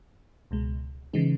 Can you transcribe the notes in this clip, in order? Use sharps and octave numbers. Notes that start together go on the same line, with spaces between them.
C#2 B2 G#3
C#3 E3 G#3 D#4